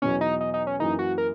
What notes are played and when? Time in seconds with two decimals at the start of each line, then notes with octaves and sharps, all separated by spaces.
0.02 E2 B2 F#3 C#4
0.21 D#4
0.41 D#4
0.54 D#4
0.67 C#4
0.79 F#2 E3 A#3 D#4
0.99 F#4
1.18 A#4